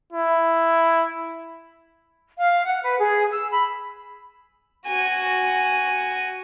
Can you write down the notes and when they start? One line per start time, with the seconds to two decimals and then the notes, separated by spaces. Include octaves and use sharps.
0.13 E4
2.38 F5
2.65 F#5
2.83 B4
2.99 G#4
3.31 E6
3.52 B5
4.87 F#4 G#5